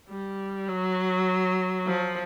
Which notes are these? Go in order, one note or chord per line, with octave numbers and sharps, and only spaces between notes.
G3
F#3
F3